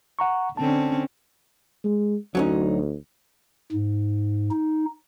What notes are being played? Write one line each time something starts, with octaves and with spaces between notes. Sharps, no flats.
F#5 A#5 C#6
D3 C4 C#4 A5
G#3
D2 F#3 C#4 D#4
G#2
D#4